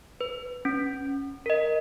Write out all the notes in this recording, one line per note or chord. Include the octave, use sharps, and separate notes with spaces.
B4
C#4
A#4 D#5